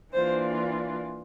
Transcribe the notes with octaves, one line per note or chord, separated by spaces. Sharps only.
E3 A#3 D4 F4 C5